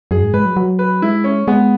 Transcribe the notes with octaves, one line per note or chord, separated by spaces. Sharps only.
F#2 G#4
G#2
G#3 B4
F#3
F#3
B4
G#3 E4
C#4
G#3 B3